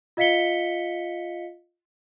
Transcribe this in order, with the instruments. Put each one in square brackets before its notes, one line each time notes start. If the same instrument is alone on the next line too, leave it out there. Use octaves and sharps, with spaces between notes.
[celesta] F4 D#5 F5 B6 C#7 G7